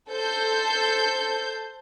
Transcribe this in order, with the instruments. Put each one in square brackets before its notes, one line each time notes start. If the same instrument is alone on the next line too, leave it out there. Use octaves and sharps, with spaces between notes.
[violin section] A4 C5 G6